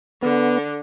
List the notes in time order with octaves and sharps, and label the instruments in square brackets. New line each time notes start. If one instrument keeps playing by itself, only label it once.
[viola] D3 [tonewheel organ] B3